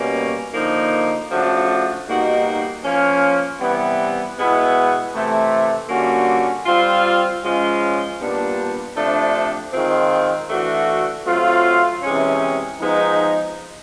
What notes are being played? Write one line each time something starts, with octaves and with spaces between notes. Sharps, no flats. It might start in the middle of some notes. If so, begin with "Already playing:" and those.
Already playing: B2 G3 A#3 C#4
D3 F3 A#3 D#4
C#3 F3 A3 D4 F#4
B2 G3 A#3 D#4 F#4
F3 A#3 C#4
C3 E3 G3 B3
B2 G#3 B3 E4
C3 E3 A3
D3 G3 A#3 C#4 F#4
G3 C4 F4
C#3 F3 G#3 C#4 F4
A#2 G3 B3 D4
C3 F3 A3 D4
D#3 G#3 C4 F4
E3 A3 D4 F#4
F#3 A3 C4 F4
C3 E3 G#3 C#4
F3 G#3 B3 D#4